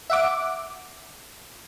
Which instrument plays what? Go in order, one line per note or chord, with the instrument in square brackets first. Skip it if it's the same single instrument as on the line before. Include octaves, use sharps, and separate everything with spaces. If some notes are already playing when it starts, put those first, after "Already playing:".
[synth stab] E5 F#5 D6